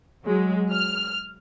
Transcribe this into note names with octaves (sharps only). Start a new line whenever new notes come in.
F#3 G#3
F6